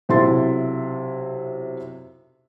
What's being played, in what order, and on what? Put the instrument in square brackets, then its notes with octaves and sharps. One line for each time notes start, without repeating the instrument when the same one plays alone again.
[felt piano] B1 C3 E4 A4 C6 A6